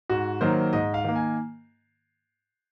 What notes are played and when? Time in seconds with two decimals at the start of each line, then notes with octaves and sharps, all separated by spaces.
0.09 G#2 F#4
0.41 D#3 F#3 A#3 C5
0.73 G#2 D#5
0.94 F5
1.04 D#3 A#3
1.16 G#5